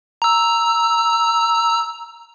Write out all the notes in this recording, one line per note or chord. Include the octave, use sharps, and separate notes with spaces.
A#5 E6